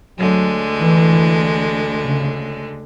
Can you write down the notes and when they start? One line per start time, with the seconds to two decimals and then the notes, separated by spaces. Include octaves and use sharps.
0.18 D2 D3 F#3 G#3
0.80 E3
2.04 C#3